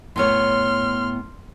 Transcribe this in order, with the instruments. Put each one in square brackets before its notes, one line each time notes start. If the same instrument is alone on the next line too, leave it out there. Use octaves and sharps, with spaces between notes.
[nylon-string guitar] A2 B3 C#5 [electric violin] C6 F6